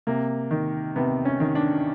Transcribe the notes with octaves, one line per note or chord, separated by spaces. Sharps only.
C3 A#3
D#3
C3 B3
C#4
D#3
D4